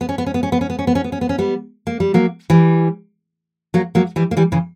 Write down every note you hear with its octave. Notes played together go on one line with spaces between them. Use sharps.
B3
C#4
B3
C#4
B3
C#4
B3
C#4
B3
C#4
B3
C#4
B3
C#4
B3
C#4
G3 B3
A#3
G3
F#3 A#3
E3 G3
F#3 A#3
F#3 A#3
E3 G3
A#3
E3 G3
C#3 E3